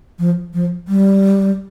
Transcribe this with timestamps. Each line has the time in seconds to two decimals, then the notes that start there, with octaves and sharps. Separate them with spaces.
0.19 F3
0.54 F3
0.88 G3